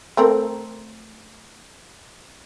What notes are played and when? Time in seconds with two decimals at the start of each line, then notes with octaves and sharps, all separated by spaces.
0.17 A3 C4 A#4